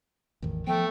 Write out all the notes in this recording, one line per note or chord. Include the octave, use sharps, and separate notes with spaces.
A1 E2 D#3
F3 A3 B3 G5